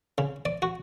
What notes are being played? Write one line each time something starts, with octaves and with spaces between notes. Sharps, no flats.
C#3
D5
F#4